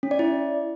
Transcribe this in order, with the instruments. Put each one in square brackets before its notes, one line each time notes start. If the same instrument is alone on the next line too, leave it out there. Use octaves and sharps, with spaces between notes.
[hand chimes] C#4
D5
E4